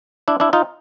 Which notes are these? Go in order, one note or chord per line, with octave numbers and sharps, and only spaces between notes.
D4 E4
D4 E4
D#4 F4